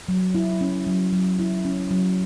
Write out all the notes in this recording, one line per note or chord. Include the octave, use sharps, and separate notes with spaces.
F#3
E4
C#4
F#3
F#3
E4
C#4
F#3